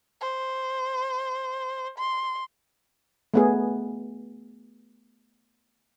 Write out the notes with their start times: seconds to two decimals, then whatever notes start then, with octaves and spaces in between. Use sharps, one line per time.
0.21 C5
1.98 C6
3.34 A3 B3 G#4